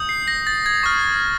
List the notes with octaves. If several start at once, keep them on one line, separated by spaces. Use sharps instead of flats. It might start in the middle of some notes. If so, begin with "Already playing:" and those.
Already playing: D#6 G6
C7
A#6
A6
G#6
C#6 F6 A6